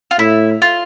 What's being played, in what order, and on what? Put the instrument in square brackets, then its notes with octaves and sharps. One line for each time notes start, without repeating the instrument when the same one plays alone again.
[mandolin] F4
[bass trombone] A2 [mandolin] E4
[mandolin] F4